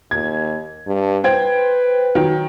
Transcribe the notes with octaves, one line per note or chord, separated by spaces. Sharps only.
D#2 G#6
G2
B4 C5 G5 G#6
D#3 F#3 G5